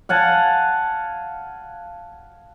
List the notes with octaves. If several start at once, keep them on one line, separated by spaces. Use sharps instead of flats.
F5 F#5 G#5 A5